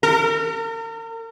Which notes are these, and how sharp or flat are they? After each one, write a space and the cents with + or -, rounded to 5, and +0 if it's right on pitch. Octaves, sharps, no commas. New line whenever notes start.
A#4 -40